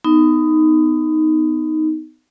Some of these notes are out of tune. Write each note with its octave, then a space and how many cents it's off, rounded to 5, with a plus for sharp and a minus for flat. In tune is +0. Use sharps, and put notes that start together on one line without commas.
B3 +30 D#4 +0